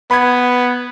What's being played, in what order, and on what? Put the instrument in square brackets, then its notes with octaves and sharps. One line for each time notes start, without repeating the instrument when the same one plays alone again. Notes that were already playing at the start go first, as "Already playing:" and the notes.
[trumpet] B3 [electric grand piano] B5 G#6